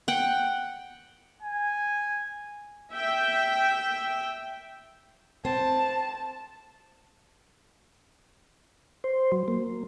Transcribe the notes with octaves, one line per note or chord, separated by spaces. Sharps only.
F#5 G5
G#5
E5 G5
C4 A5
C5
F#3
A#3